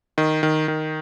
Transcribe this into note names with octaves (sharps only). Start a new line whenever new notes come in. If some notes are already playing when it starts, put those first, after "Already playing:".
D#3
D#3
D#3